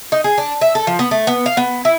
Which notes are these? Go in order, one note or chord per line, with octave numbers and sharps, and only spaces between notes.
D#4
G#4
D4
E5
A4
F3
B3
A3
B3
F5
B3
E4